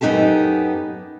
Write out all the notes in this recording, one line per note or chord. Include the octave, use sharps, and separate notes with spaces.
F#2 B3 D#4 F4 G4 A4